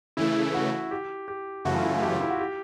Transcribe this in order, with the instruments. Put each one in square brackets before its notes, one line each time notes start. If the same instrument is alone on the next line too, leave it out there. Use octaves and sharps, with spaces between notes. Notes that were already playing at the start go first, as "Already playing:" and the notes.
[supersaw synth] C#3 E3 A3 [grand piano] E4
[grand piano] F#4
G4
G4
[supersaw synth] F#2 C#3 E3 A3 [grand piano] F#4
[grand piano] F4
E4
F4
G4
F4
E4
F#4
G4